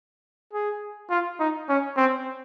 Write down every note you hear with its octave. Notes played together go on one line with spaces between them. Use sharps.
G#4
F4
D#4
C#4
C4